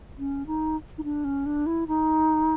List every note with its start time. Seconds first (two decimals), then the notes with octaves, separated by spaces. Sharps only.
0.18 C#4
0.47 D#4
0.98 D#4
1.04 D4
1.24 C#4
1.46 D4
1.66 E4
1.88 D#4